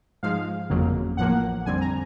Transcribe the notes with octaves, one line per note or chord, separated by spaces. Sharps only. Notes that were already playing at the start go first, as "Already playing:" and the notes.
G#2 F3 G#3 F5
G1 F2 C#3 F#3 A#3
A1 A2 F3 A#3 F#5
F2 D3 G3 C4 G#5
A#5